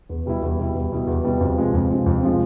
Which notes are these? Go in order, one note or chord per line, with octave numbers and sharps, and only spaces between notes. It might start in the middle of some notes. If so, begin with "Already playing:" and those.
E2
B2 G3 B3 E4
E2
B2 G3 B3 E4
E2
B2 G3 B3 E4
E2
B2 G3 B3 E4
F2
C3 F3 G#3
F2
C3 F3 G#3
F2
C3 F3 G#3